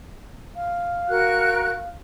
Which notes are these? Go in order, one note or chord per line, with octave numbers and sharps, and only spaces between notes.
F5
F#4 A#4 F#6